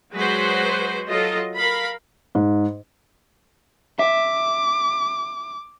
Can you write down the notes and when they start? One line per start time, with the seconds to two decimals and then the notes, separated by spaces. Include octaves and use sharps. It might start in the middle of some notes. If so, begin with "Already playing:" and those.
0.14 F#3 G#3 F#4 B4 C5
1.07 F#3 F4 A4 D#5
1.54 A#4 F5 B5
2.35 G#2
3.99 E5 D6